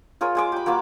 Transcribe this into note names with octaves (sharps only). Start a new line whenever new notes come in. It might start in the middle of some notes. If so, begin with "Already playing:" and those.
F4 G#4 A#4 C#5
G#3 G#4 D6
G4 B5
F#3 A#3 F4 D6